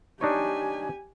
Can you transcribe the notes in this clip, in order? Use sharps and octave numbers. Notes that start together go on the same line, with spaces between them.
D4 D#4 G4 C#5 G#5